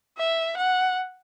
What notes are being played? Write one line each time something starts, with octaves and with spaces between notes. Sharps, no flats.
E5
F#5